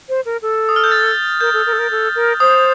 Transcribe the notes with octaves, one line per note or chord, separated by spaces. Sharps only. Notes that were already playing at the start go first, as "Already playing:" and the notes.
C5
A#4
A4
D#6
F6
G6
A6
A#4 G6
A4
A#4
A4
A#4
A4
A#4
C5 D#6